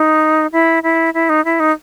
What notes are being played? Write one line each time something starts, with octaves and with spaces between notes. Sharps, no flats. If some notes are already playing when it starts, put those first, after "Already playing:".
Already playing: D#4
E4
E4
E4
D#4
E4
D#4